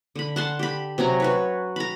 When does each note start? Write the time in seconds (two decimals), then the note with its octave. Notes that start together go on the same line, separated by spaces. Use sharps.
0.15 D3 B5
0.36 F#5 A5 C6
0.59 G4 B5
0.98 C3 F#3 C#4 A#5
1.20 F#4 B4 C#5
1.76 A#5 B5